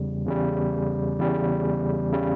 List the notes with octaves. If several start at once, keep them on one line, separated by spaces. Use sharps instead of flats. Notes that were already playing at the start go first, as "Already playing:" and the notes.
Already playing: E2 C#3 G3
E2 C#3 G3
E2 C#3 G3
C#3 G3